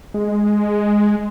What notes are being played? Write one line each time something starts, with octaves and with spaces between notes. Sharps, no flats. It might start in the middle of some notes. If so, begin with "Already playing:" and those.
G#3